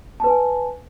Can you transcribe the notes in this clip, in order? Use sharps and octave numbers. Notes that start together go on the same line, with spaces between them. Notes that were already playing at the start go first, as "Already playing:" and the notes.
B4 G#5 A5